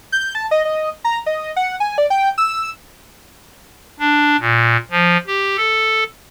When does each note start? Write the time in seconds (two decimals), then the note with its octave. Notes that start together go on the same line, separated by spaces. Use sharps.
0.12 G6
0.35 A5
0.51 D#5
0.65 D#5
1.04 A#5
1.26 D#5
1.56 F#5
1.80 G#5
1.98 D5
2.10 G5
2.38 E6
4.00 D4
4.40 A#2
4.91 F3
5.27 G4
5.57 A4